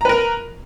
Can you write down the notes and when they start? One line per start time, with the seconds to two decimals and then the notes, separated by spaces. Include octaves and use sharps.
0.01 A#5
0.05 B4
0.09 A#4